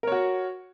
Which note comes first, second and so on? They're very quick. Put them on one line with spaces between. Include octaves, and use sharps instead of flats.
A#4 C#5 F#4